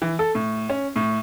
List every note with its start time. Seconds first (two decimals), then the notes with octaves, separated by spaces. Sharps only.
0.02 E3
0.19 A4
0.35 A2
0.69 C#4
0.96 A2